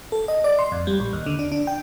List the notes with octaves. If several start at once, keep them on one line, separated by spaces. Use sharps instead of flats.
A4
D#5
D5
C6
F2
G3
A#1
D#2
D3
D4
D4
G5